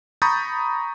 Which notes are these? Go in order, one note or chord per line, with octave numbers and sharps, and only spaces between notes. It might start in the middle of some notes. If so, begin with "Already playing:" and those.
A#5 B5 C#6 D#6 G6 A6